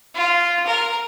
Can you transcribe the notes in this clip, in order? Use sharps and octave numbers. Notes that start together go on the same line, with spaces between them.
F4
A#4